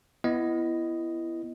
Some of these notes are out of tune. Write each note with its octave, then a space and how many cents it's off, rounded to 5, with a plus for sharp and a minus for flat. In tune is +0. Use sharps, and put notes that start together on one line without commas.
B3 +0 E4 +20 D#5 +0